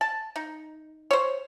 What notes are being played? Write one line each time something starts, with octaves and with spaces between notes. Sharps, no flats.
A5
D#4
C5 C#5